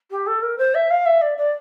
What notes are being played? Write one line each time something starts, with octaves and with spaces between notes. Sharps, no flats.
G4
A4
A#4
C5
E5
F5
E5
D5
D5